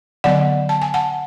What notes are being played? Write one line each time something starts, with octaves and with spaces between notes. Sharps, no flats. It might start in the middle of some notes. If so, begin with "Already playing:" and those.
D3 F#3 B3 D5 F#5
A5
G#5
F#5 A5